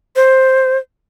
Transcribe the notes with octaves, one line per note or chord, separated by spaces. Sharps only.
C5